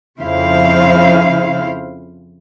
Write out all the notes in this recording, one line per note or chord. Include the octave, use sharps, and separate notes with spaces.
F2 C#3 E4 C5 F5